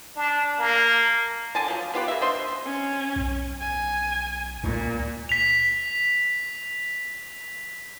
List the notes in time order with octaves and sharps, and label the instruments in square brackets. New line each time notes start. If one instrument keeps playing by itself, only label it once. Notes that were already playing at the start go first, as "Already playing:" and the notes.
[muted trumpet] D4
A#3
[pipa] D3 G#5 A5
F3 F#3
B3 F4 G4 B4
A#3 E5
D4 C5 D#5 C6
[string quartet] C#4
[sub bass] B1
[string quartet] G#5
[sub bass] C#2 [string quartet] A#2
[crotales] B6 F7